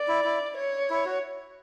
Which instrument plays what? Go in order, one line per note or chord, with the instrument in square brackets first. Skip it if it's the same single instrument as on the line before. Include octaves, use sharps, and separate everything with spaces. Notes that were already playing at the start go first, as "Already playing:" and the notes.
Already playing: [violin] D5
[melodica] E4
E4
[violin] C#5
[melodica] E4
F#4